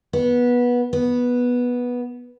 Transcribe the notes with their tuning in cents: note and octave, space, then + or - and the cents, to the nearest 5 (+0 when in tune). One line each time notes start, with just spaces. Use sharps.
B3 -20
B3 -10